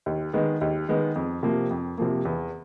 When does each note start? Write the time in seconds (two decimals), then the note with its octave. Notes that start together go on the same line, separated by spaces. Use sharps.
0.06 D#2
0.33 D#3 G#3 B3
0.61 D#2
0.88 D#3 G#3 B3
1.16 F2
1.43 C3 F3 A#3
1.71 F2
1.98 C3 F3 A#3
2.25 E2